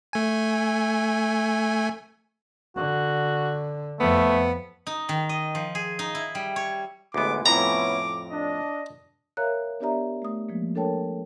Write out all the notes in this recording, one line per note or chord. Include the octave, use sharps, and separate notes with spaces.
A3 G#5
D3 F#4
F2 A3 B3
D#4
D#3
D#5
F3
G#4
D#4
E4
G3
C#5
A1 D2 G#3 B3 D6
F2 A2 B3 C#4 E4 A#5 D6
D4 D#5
A#4 C#5 E5 F5 A#5 F#6
B3 D4 G4 D5 E5 A#5
A3 D#6
F3 G#3 A#3
D4 A4 A#4 C#5 G5 A5